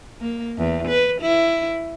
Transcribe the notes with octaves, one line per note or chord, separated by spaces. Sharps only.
A#3
E2
B4
E4